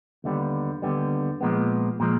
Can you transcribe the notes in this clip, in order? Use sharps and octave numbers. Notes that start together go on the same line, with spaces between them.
D#2 D3 G3 B3
D#2 D3 G3 B3
A#2 F3 G#3 B3
A#2 F3 G#3